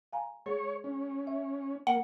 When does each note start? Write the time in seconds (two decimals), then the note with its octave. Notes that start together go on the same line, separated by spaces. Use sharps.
0.13 F5 G#5 A#5
0.46 G#3 G#4 C#5
0.84 C#4
1.27 E5
1.87 A#3 F#5